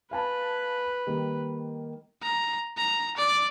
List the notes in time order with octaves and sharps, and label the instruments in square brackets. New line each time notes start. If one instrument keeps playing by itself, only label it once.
[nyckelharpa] B4 [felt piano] F5 G#5 A5
[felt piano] D#3 G3 A#3
[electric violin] A#5
A#5
D5